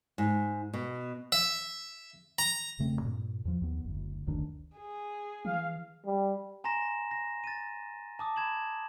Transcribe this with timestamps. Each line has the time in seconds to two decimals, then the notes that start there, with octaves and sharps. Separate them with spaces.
0.18 G#2
0.73 B2
1.32 E5
2.39 A#5
2.79 E1 C#3 A3 C4
3.02 G2 A#2
3.45 E2 F3
3.62 D#2 B3
3.84 F#1 D2
4.27 F#1 D2 D#3 D4
4.77 G#4
5.45 E3 F5
6.05 G3
6.64 G#5 A#5 C6 A#6 E7
7.11 A#6
7.44 A6 D#7
8.19 A5 D6 D#6
8.36 B5 G#6 E7 F#7